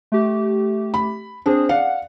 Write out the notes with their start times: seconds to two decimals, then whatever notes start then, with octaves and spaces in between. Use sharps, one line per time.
0.12 A3 G4
0.94 B5
1.46 C4 D4 G#4
1.69 D5 F5 F#5